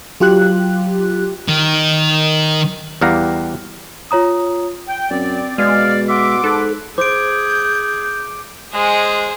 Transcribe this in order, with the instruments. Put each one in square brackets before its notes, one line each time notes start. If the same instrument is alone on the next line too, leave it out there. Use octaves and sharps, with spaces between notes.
[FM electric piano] F#3 F4 G4 F#6
[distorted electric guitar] D#3
[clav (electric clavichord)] E2 G3 G4 F5 F#5 A#5
[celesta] F4 C#5 A#5 D#6
[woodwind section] G5
[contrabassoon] F#2 [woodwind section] C4 D5
[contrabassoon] B2 [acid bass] G#3 [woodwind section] D5 [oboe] F5
[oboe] E5 [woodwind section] F#5 C6 D6
[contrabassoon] G#2 [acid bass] A4 [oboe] B4
[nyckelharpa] G#4 [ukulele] C5 [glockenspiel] D6 D7 [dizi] G6
[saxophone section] G#3 [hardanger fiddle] G#4 C5